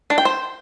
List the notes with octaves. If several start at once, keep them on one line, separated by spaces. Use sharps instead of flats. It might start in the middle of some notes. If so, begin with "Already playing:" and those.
D4
G5
C5